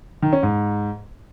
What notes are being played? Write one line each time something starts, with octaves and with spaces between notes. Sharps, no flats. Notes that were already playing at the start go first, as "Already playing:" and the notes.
D#3
C#4
G#2